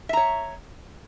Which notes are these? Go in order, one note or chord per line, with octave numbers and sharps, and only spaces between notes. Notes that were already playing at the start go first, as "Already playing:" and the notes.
C#5 E5 A#5